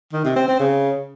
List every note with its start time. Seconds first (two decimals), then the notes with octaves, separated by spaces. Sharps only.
0.13 D#3
0.24 C3
0.36 C4
0.48 C4
0.59 C#3